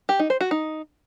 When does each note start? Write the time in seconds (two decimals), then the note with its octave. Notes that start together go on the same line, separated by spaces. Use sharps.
0.09 G4
0.19 D#4
0.30 C5
0.41 F#4
0.51 D#4